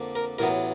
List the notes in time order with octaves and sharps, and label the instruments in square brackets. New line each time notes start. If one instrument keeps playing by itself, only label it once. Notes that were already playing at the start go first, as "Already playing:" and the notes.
Already playing: [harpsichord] F2 D3 A#3 D4
A#4
A1 A2 F#3 B3 A#4